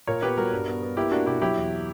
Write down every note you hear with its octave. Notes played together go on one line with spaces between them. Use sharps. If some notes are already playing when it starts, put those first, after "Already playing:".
A#2 A#4 C#5
B3 G4 B4
G3 F#4 A#4
G2
B3
B3
A#3 E4 G4
A#3 D4 F#4
B2 E4 G4
F#3 E4 G4
E2